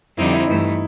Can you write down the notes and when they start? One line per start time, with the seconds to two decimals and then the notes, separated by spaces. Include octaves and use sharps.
0.17 F2 D3 G3 C4 D#4 E4
0.33 E4
0.46 G2 E3 A3 D#4